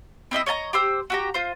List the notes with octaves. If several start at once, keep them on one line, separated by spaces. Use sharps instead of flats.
C4 E4 D#5 E5
C#5 D#5 A5 A#5
G4 C5 E6
F#4 G4 A#5
F4 C5